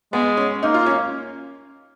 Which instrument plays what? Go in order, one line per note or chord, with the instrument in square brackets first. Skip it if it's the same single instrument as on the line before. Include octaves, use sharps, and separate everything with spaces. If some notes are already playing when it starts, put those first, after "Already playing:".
[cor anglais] G#3 [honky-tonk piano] B3
[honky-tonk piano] C#4
[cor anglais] A#3 [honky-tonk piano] D#4
[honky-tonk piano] F4
C#4